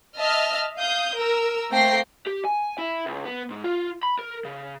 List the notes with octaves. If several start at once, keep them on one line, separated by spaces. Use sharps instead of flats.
D#5 E5 A5 F6
F5 D#6 G6
A#4 E6
A3 A#3 C4 G5 A#6 C7
G4
G#5
E4
C#2
B3
G#2
F4
B5
A#4
C#3